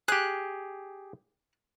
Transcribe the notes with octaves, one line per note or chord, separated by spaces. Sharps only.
G4 G#4 F#6